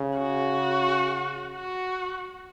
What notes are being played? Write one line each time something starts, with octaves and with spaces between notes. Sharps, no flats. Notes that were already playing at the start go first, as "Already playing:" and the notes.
Already playing: C#3
F#4
F#4